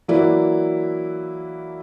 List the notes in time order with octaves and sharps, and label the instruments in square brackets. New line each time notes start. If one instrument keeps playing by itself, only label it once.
[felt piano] E3 F#3 A#3 E4 B4 D5